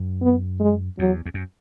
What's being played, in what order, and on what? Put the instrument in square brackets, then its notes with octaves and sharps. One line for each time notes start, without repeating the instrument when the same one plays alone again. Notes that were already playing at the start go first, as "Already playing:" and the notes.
Already playing: [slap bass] F#2
[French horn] B3
G#3
[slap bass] E2 [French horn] F#3
[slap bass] E2
F#2